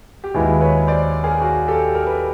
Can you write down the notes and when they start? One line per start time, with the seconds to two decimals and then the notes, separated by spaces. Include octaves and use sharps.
0.24 G4
0.34 D#2 D#3 G#3 B3 E4 F#4 G#4
0.61 B4 C#5
0.87 C5 D5
1.24 G#4 A#4
1.42 F#4 G#4
1.68 G4 A4
1.95 A#4
2.06 B4